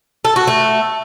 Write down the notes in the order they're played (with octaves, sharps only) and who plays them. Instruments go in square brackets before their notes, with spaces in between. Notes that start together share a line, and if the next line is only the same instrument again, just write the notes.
[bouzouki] A4
F#4
A3